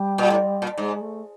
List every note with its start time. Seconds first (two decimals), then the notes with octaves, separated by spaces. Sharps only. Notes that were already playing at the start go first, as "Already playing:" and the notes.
Already playing: G3
0.18 A#2
0.30 A2
0.62 A#2
0.78 G#2 G#3
1.01 A3